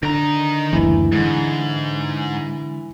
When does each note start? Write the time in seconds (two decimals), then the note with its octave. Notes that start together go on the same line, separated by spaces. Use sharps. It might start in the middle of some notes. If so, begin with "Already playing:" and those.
0.03 D3 D#3 A#5
0.73 F#1 D2 E3
1.12 G#2 D3 G#3